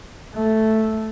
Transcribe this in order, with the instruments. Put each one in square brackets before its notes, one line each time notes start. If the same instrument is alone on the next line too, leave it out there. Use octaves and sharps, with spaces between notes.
[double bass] A3